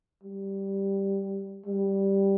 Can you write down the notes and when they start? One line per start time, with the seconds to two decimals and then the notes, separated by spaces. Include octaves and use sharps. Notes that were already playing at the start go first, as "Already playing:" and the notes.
0.24 G3
1.66 G3